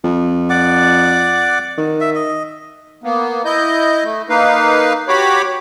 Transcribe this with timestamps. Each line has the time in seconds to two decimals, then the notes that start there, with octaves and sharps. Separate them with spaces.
0.04 F2
0.50 D5 F#5 D6
1.78 D#3
2.00 E5
2.15 D#5
3.04 A#3 B3
3.45 E4 D#5 G6
4.04 A3
4.29 A#3 D#4 B4 F5
5.08 F#4 G4 C#5 B5 D6